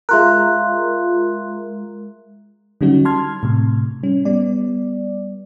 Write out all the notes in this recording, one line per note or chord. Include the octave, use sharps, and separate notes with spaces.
G#3 F4 A#4 E5 C6 F#6
D3 F#3 G3 C#4 D#4 F#4
A5 C6 F6 G#6
A2 C3
G3 C#4
G3 B3 D5